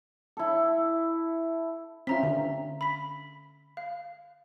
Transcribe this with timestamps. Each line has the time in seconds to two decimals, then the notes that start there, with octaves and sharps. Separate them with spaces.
0.37 E4 A4
2.07 C4 C#4 F4 E5 A#5 B6
2.23 D3
2.81 B5 B6
3.77 F5